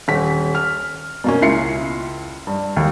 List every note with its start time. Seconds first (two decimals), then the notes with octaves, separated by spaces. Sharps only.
0.08 D#1 B6
0.55 F6
1.24 B2 A#3 C#4
1.42 C#2 E4 F4 C7 C#7
2.47 G2
2.77 D#2